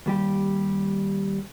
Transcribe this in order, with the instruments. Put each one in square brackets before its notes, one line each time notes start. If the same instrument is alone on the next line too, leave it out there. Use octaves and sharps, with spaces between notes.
[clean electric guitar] D#2 G3 G4